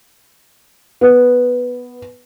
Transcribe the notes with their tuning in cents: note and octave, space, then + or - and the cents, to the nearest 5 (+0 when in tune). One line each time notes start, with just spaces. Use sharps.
B3 +0